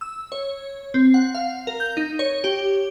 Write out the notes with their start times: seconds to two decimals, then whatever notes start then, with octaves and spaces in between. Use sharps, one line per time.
0.01 E6
0.32 C#5
0.94 C4
1.14 F#5
1.35 F5
1.67 A#4
1.80 G6
1.97 D#4
2.19 C#5
2.44 G4